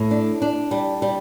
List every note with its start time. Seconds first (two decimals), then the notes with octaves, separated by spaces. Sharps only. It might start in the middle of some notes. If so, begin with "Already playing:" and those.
Already playing: A2
0.11 D4
0.42 D4
0.71 G3
1.02 G3